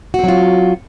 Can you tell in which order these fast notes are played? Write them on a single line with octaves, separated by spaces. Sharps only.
F#4 C4 F#3 F4